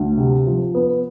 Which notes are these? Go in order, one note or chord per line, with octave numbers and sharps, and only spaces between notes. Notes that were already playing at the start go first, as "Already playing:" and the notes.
Already playing: D2
C3
F3
B3